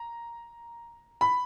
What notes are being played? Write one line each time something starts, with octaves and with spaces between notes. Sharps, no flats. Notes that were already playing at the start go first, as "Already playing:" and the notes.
Already playing: A#5
B5